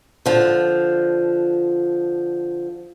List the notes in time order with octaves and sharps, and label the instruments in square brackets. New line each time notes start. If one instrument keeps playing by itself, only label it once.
[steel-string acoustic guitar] D3 F3